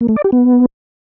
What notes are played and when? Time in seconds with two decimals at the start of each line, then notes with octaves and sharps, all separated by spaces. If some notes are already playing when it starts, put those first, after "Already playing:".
0.01 A#3
0.09 A3
0.16 D5
0.24 G4
0.32 B3